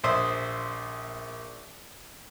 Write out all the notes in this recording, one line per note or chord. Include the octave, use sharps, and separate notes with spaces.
A#1 C5 E5 C6 D#6